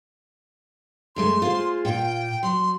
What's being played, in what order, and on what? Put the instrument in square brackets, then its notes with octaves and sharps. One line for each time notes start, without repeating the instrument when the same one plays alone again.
[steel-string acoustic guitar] F#2 G#3 A3 [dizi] C6
[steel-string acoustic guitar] F4 G#4 C5
[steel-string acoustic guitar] A#2 F4 [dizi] G5
[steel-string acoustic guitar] F#3 [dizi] C6